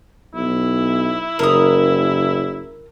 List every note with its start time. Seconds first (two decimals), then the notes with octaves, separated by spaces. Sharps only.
0.34 B1 E4
1.39 F#1 A#4 D#6